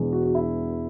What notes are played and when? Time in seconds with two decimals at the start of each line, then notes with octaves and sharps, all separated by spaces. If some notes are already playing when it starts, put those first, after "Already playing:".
Already playing: E1 E2 B2 G#3
0.13 F#4
0.26 F#4
0.35 E4